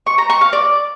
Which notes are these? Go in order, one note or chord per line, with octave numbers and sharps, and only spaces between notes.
C#6
A#5
C#6
F5
D5